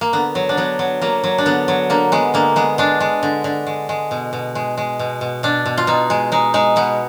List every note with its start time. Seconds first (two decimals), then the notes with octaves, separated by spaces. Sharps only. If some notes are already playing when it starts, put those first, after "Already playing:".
0.01 A#3
0.13 D3 B3
0.35 F#3
0.49 D4
0.57 F#3 B3
0.79 F#3
1.01 F#3 A#3
1.24 F#3
1.38 D4
1.46 D3 B3
1.68 F#3
1.90 D3 A#3
2.12 G#3 B3
2.34 D3 A#3
2.56 G#3 B3
2.78 G#3 D4
3.00 G#3
3.23 D3
3.44 D3
3.67 G#3
3.89 G#3
4.11 B2
4.33 B2
4.55 G#3
4.77 G#3
4.99 B2
5.21 B2
5.43 B2 D4
5.66 B2
5.77 F4
5.87 B2 D#4
6.10 G#3
6.32 G#3 D#4
6.54 G#3 D#4
6.76 B2 B3